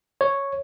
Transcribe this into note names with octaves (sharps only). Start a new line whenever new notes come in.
C#5